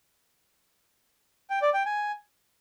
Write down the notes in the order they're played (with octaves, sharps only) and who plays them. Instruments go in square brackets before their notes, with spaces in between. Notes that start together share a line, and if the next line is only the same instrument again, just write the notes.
[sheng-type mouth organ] G5
D5
G5
G#5